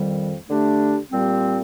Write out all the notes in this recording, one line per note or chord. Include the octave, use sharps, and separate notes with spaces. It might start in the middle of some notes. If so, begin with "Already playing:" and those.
Already playing: F2 D#3 G3
D3 A3 D4 G4
A#2 G3 C4 G4